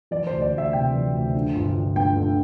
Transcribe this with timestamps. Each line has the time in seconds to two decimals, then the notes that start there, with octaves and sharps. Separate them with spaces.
0.11 E3 D5
0.27 C5
0.32 D2
0.41 D5
0.52 D2
0.58 E5
0.73 C3 G5
0.93 E3
1.13 D2
1.35 D3
1.55 G1
1.75 G1
1.96 G2 G5
2.16 D3